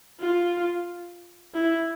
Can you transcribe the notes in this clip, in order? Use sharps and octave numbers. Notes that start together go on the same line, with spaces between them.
F4
E4